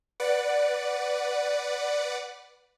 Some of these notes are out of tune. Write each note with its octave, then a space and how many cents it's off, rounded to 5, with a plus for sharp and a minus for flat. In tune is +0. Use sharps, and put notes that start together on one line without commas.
B4 +0 D5 +0 F#5 +0